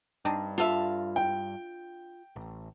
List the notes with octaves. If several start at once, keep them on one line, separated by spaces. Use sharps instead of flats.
G2 C4 D4 D#4
D3 F4 A4 E5 F5
G5
A1